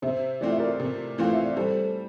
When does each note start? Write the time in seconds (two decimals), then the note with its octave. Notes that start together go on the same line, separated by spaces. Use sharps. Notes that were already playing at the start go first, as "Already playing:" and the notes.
0.02 C3 C5 E5
0.41 E3 A3 C4 F4 D5
0.51 E5
0.59 A#4 D5
0.80 C3
1.18 E3 A3 C4 F4 F5
1.32 E5
1.44 D5
1.56 G3 A4 C5